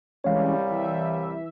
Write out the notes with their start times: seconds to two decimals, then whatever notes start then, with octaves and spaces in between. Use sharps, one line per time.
0.24 C2 E3 G3 G#3 C#4 C#5 F5
0.68 E3 E5